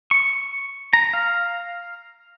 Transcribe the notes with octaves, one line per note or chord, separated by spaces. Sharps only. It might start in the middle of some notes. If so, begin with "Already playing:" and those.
C#6
A#5
F5